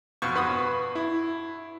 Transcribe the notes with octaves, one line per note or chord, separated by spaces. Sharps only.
F2 B2 C#6
G2 F#4 B4 B5 D#6
E4